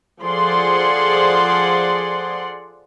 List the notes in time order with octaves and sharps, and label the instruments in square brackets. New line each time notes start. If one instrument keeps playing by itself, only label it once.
[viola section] F3 G#4 A4 D5 F#5 C6